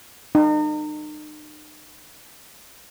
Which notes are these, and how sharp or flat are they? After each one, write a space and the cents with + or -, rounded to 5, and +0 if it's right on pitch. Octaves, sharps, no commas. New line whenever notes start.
D#4 -40